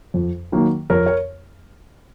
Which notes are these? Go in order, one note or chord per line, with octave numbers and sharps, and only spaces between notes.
F2
D#3 F#3 A#3
F2 A#4 C#5
C#5